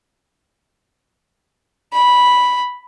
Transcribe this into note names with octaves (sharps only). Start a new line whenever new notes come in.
B5